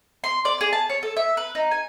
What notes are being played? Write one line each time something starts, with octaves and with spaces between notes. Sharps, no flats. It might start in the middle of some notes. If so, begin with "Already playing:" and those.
C6
D5
G#4
A5
C#5
A4
E5
B4
D#4
G#5